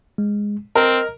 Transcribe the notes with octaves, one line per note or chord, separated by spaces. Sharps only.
G#3
C4 A#4 D#5